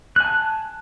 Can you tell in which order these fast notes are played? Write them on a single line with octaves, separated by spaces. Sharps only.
F#6 G#5 A5